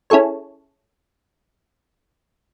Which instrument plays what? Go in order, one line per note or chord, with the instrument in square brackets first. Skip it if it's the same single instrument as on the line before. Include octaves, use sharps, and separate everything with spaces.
[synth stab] C#4 E4 G#4 A4 C#5